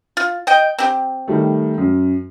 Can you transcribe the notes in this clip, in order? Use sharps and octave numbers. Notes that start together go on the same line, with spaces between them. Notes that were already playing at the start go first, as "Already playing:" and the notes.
F4
D#5 G5
C4 G4
D#3 G3 A3
F#2